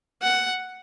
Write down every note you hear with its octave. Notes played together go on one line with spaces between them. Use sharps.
F#5